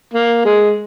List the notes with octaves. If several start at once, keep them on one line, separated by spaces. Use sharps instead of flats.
A#3
G#3